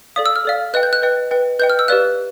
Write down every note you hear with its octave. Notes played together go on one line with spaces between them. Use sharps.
A4 D5 F5 D#6
E6
F6
A4 D5 F5
B4 D#5 G5 F#6
G6
F#6
B4 D#5 G5
B4 D#5 G5
B4 D#5 G5 G6
F6
E6
G4 B4 D5 F5 F#6